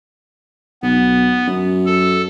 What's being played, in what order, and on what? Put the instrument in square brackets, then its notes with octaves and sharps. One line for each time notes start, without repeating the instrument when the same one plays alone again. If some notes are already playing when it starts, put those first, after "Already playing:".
[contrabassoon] B1 [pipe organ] B3
[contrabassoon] F#2
[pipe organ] A4